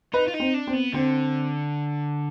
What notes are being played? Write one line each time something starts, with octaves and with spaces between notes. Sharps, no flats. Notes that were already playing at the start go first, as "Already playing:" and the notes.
D#4 B4
F4
D#4
C4
D4
C4
B3
D3 C4